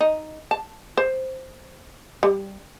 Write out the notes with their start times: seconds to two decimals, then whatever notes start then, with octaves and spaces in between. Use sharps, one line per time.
0.01 D#4
0.51 A5
0.97 C5
2.23 G3